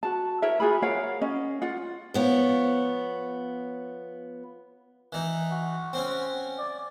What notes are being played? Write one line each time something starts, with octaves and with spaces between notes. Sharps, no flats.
F#4 A5
E4 A#4 C#5 E5
F4 F#4 G#4 B5
A#4 C#5 F5 F#5
C#4 D#5
F4 F#5
F3 B3 C#5
E3 D#4
F#4
C4 C#4
D5